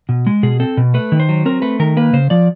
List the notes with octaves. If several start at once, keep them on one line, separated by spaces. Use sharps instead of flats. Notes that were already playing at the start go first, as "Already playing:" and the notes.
B2
G#3
B2 G#4
C4 A4
B2
A3 B4
D#3
C5
F#3
C4 A#4
A3 B4
D#3 A#4
A#3 B4
C#3 C5
F3 D5